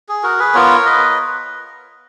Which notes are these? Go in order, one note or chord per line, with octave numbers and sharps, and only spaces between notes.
G#4
F#4 A#4
G#4 B4
B3 F4 A#4 C#5
B4 D#5